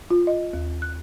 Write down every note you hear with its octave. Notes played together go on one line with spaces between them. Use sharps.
F4
D#5
D#2
F#6